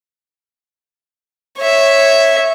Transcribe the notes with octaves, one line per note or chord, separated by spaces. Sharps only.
C#5 E5